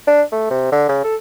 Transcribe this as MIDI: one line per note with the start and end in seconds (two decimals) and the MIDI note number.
0.07 0.22 62
0.32 0.50 57
0.50 0.70 48
0.72 0.84 50
0.89 1.02 49
1.04 1.16 69